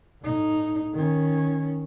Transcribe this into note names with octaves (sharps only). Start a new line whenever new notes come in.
A2 D#4
D#3 C#4